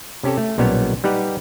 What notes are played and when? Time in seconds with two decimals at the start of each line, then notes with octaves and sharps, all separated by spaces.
0.23 C3 C#4 G4 A4
0.37 A3
0.58 B1 A#2 G3 B3 C#4 C#5
1.04 G3 D#4 G4 B4 F#5